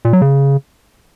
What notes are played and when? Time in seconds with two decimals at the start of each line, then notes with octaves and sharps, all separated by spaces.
0.05 A#2
0.13 F#3
0.22 C#3